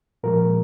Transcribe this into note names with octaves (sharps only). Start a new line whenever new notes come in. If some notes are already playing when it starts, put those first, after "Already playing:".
A#2 F3 G#3 A#4